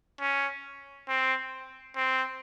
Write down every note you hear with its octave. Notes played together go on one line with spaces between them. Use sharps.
C#4
C4
C4